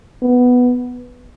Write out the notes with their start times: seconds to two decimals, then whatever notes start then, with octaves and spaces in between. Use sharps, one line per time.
0.22 B3